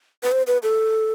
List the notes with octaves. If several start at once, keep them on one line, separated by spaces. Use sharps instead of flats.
B4
C5
B4
A4